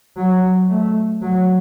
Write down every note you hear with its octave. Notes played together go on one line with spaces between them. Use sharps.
F#3
A3
F#3